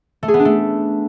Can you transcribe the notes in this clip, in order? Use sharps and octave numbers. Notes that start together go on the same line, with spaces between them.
A3
G#4
B3
D4
A3